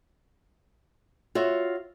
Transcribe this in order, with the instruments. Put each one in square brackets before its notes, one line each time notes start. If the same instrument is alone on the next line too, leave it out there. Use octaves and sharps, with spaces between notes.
[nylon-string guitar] F4 F#4 C#5 E5